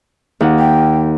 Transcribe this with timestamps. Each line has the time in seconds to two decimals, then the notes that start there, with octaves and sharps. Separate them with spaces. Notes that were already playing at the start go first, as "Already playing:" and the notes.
0.41 D#2 F#5
0.59 G5